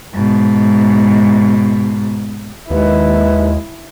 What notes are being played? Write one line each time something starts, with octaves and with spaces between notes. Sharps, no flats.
G#2 B2
D#2 G#3 E4 B4